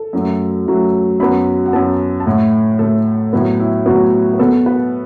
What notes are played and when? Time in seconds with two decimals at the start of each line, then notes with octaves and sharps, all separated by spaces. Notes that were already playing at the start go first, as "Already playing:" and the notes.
Already playing: A4
0.13 F#2 F#3 A3
0.66 F#2 F#3 A3
1.20 F#2 F#3 B3 B5
1.66 F#5
1.73 F#2 F#3 B3 A5
2.20 A5
2.26 A2 A3 F#5
2.79 A2 A3 A4
3.33 A2 F#3 B3 E4
3.60 E4
3.86 A2 F#3 B3 F#4
4.33 B4
4.39 B2 B3 A4
4.66 B4